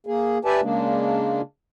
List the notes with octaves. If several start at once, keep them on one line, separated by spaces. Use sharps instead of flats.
A#3 G#4
G4 B4 D5 E5 G#5 A5
C#3 G#3 A#3 D4